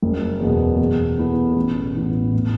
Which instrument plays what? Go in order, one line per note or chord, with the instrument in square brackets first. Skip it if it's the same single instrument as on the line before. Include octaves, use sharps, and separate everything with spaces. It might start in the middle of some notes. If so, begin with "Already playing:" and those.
[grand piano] F#1
E2 B2
E2
B2 B3 E4 A4
A1
A2 E3 B3
A2